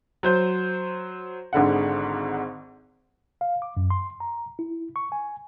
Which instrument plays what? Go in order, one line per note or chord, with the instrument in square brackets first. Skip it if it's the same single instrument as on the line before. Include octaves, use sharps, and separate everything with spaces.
[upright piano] F#3 C5 G6
G#1 G#2 D3 F#5
[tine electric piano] F5
D6
F#2
C6
A#5
E4
C#6
G#5